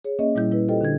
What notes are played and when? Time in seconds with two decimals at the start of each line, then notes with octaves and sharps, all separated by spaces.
0.04 G#4 C#5
0.19 A#3 C#4 G#4 D#5 E5
0.35 A#2 G3 E4 G6
0.51 G3 E4 B4
0.69 F4 G4 A4 C5 D#5 G5
0.81 D3 D4 G#6